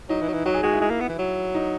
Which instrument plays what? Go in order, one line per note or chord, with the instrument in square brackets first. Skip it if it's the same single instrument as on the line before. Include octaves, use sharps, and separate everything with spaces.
[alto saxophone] F#3 [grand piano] D#4
[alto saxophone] E3
F#3
E3
[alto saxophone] F#3 [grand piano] F#4
[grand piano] G#4
[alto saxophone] G#3 [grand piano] F#4
[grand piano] E4
[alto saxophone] G#3
A#3
B3
E3
F#3
[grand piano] D#4